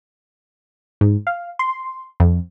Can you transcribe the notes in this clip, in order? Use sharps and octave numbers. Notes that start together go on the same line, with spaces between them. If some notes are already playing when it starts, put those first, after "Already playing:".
G#2
F5
C6
F2